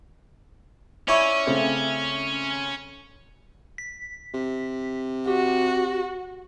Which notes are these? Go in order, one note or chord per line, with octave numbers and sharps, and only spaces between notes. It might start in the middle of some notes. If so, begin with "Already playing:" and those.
C#4 E4 C#5 D5
C#3 A3 C4
B6
C3
F#4 G4